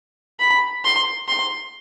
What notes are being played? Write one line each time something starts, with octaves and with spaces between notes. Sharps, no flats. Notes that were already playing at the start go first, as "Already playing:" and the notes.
B5
C6
C6